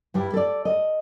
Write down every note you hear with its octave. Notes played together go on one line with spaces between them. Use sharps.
G2 E4 G4
A4 D5
D#5